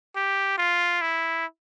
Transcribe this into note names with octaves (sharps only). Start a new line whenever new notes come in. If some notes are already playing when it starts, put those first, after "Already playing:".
G4
F4
E4